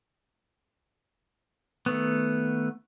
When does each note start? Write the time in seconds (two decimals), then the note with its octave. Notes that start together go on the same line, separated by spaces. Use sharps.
1.86 D#3 A3 B3